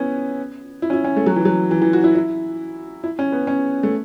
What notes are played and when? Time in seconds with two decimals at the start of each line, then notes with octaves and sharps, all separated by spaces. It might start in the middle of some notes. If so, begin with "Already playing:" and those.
Already playing: B3 C#4 E4
0.82 E4
0.90 C#4
0.93 E4
1.04 C#4
1.16 A3
1.26 F#3
1.36 E3
1.45 F#3
1.71 E3
1.82 E3
1.93 F#4
2.04 E4
2.15 E4
3.04 E4
3.19 C#4
3.32 B3
3.47 C#4
3.83 A3